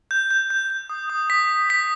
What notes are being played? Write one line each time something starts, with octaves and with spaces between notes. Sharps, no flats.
G6
G6
G6
G6
D#6
D#6
D#6 B6
D#6
D#6 B6